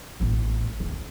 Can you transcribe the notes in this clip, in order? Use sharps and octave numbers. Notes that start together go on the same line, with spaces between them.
A1 A2
D#2